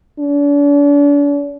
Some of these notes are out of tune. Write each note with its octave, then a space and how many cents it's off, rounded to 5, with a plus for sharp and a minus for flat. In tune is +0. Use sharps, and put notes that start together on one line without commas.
D4 -40